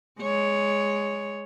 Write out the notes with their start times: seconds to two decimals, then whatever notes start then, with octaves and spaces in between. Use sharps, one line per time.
0.20 G#3 C#5